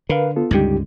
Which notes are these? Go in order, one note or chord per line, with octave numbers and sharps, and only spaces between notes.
D3 A#4 B4 F5
B3 F4 A4
C#2 G2 D3 G3 D#4 G4